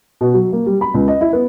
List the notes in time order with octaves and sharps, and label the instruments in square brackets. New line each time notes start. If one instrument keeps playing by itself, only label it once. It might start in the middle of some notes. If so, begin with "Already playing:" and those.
[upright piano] B2
F#3
A#3
G3
B5
C#2
D#5
E4
B3